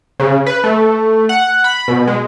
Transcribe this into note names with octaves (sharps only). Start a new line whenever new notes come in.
C#3
B4
A3
F#5
B5
B2
G#3